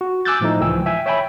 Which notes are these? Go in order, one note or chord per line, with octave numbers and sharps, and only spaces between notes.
F#4
G#5 D6 E6 F#6 G6 A6
A2 F3 A3 D#4
C#2 E3 F3 G5 G#5 E6
E5 G5 G#5
C#5 E5 G5 G#5 B5